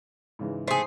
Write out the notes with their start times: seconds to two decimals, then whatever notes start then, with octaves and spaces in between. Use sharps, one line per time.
0.39 G#2 C#3 E3
0.68 A3 G#4 C5